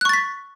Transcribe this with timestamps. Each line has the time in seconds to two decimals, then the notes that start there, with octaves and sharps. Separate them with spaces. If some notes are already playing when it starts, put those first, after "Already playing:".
0.01 F#6
0.05 C#6
0.09 A6
0.13 B6